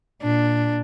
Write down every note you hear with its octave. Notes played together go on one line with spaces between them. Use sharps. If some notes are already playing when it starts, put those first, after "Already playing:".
A#2 D4